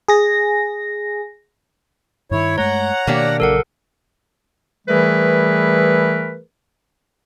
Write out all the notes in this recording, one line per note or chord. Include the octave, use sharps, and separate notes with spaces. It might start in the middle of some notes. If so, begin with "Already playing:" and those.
G#4 A#6
G2 D#3 E4 C#5
G2 G#3 A3 C#5 F#5 A#5
B2 D#3 A#3 D4 G4
A#1 C#3 F#3 A4 A#4 F#5
E3 G3 A3 G#4 A#4 B4